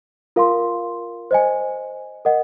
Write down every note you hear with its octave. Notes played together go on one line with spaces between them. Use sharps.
F4 A#4 F5 C6
C5 D#5 G#5
A#4 D#5 F#5